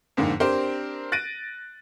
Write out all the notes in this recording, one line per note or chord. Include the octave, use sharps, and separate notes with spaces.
F2 G#2 D3 A#3
C4 D4 G4 A#4 C5
F#6 A6 A#6 D7 D#7